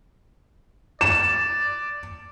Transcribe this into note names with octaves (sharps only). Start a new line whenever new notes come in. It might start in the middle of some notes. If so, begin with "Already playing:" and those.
D5 E7